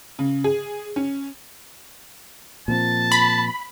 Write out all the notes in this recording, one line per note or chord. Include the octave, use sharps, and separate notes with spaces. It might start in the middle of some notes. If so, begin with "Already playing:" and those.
C#3
G#4
C#4
A#2 F3 C4 A5
B5